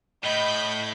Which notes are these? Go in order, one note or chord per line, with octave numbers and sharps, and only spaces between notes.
A2 D#5 B5 G6